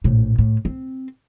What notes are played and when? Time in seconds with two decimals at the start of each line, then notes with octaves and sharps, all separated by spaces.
0.04 A#1 A2
0.38 A2
0.65 C4